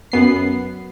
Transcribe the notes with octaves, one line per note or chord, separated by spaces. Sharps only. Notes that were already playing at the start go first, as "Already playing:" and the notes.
F#2 B3 C7